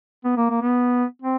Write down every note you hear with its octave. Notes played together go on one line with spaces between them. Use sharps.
B3
A#3
A#3
B3
C4